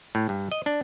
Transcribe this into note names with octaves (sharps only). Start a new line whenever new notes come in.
A2
G2
D#5
D4